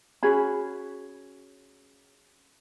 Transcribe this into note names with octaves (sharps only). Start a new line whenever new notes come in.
C#4 F#4 G#4 B5